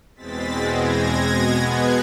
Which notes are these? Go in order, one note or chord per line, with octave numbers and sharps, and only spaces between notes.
E2 B2 G#3 C4 A6 B6
G#6 A#6
B2 G#3 B3
F#6 G#6